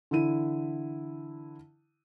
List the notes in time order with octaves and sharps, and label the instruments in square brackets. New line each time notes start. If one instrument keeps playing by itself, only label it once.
[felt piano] D3 E3 E4 D#7